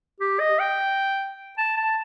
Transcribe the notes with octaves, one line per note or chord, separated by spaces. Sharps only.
G4
D#5
G5
A5
A5